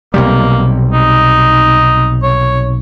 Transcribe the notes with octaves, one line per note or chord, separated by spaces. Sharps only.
B1 C3 G3 A#3
D#4
C#5